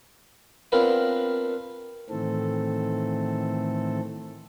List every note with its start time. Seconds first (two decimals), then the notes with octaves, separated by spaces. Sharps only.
0.72 B3 C4 D4 F4 A#4 B4
2.10 A2 D#3 E3 A3 C4 A4